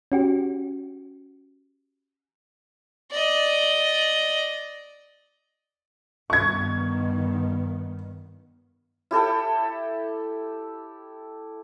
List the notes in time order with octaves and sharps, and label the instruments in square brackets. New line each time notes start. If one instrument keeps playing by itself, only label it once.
[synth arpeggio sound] C#4 F#4 G4
[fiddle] D5 D#5
[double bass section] G2 D#3 B3 [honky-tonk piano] C#6 G#6
[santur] E4 G4 A4 G5